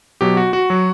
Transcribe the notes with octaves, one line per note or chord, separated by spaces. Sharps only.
B2 F#3 G4
F#4
F#4
F#3